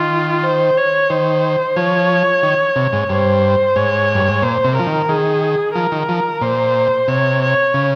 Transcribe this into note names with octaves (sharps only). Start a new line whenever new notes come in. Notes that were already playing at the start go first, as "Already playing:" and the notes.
Already playing: D#3 F4
C5
C#5
D#3 C5
F3 C#5
D#3
C3
G#2
G2 C5
G#2 C#5
G2
G#2
A#2 C5
C3
F3 A#4
D#3
D#3 G#4
F3 A#4
D#3
F3
A#2 C5
C3 C#5
C#5
C#3